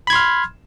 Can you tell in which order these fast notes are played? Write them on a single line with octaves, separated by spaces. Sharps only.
B5 G#6 C6 F6